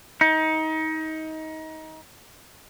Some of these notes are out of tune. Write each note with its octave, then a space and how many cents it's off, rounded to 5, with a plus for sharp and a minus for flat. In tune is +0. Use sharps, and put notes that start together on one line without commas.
D#4 +25